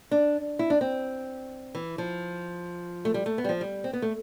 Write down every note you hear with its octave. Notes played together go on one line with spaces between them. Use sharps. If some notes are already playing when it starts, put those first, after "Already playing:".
D4
E4
D4
C4
E3
F3
A3
G3
A3
B3
G3
F3
G3
C4
B3
A3